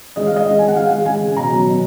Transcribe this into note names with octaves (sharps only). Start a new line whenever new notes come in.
G#3 D#5
G#3 F5
D#5
G#3
G#3 G#5
F#5
G#3 F5
G#3
G#3 G#5
C#3
B2 A#5
F#3
B2